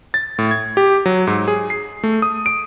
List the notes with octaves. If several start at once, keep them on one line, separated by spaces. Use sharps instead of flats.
A6
A2
G#6
G4
F#3
G#2
G#4
C7
A3
D#6
D7